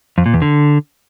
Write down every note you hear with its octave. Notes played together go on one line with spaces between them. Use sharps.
F2
A#2
E2
D3